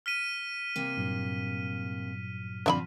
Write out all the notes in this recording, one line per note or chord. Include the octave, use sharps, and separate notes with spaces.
F6 B6 D#7
C3 A#3
G2 A#2 F#3
D3 F3 C4 D4 E5 B5